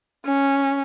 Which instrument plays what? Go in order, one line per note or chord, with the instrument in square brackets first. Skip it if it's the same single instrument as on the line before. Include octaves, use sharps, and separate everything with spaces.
[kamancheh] C#4